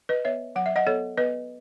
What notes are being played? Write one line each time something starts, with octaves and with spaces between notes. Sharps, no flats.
B4 D#5
B3 C#5 E5
F#3 F#5
E5
D#5 F#5
B3 A4 C#5
B3 B4 D#5